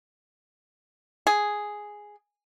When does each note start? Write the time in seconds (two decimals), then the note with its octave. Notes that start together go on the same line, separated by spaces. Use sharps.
1.27 G#4